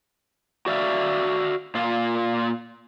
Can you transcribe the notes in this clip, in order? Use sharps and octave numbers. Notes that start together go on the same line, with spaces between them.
F#4 D5 E5 F5
A#2 F4